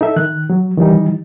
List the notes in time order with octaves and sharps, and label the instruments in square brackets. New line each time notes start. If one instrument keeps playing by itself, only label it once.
[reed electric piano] D#4 A4 E5
D#3 F#6
F#3
D#3 E3 G3 D#4